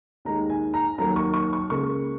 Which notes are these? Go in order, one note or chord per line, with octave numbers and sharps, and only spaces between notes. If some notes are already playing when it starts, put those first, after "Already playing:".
D#2 D#3 G#3 A#5
G#5
A#5
D#2 D#3 F#3 A#3 A#5
C#6
C#6
C#6
C#2 C#3 A#3 C#6